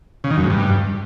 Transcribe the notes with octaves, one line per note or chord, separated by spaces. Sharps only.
C#3
D#3
F#2
G#2
G2